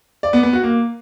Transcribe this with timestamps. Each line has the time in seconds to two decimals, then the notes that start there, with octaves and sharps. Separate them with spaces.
0.23 D5
0.33 B3
0.43 B3
0.53 F#4
0.63 A#3